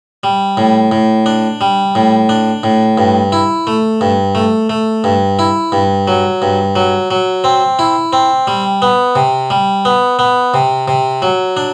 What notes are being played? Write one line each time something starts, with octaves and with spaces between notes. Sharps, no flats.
G3
A2
A2
D4
G3
A2
D4
A2
G2
E4
A3
G2
A3
A3
G2
E4
G2
F#3
G2
F#3
F#3
C4
E4
C4
G3
B3
C3
G3
B3
B3
C3
C3
F#3
D4